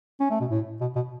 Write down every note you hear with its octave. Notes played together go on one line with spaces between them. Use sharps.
C#4
A3
B2
A2
B2
B2